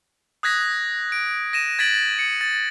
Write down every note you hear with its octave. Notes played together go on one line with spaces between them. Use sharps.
D#6 F#6 G#6 A#6 B6
D7
A#6 D#7 E7
G#6 A6 B6 D7 F#7
C#7
A6